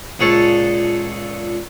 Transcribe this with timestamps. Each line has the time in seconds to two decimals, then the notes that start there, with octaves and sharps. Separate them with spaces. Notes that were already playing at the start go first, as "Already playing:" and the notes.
0.19 C#2 A#2 G#4 A4 C#5 A5